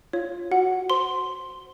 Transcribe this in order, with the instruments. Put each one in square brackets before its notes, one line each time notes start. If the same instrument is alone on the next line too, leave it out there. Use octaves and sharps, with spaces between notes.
[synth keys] F4 [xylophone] C#5
[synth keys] F#4 [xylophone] F#5
[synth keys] C5 [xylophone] C6